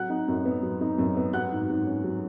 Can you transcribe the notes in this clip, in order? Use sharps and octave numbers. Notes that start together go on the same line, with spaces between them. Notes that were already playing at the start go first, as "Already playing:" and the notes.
Already playing: F#3 F#5 F#6
D#4
F#2
B3
F#3
D#4
F#2
B3
F#3 F#5 F#6
G#2
G#2
C#4
F#3